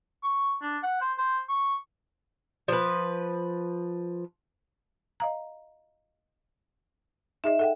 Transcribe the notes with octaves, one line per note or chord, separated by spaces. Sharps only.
C#6
D4
F#5
C5
C5
C#6
F3 B4
D#5 F5 A#5
D#4 G#4 D#5 E5
A4 F#5 G5